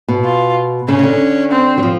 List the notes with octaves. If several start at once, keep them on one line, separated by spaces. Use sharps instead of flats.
B2
F4
C#3 C#4
C#3
D3
C4
F#3
F3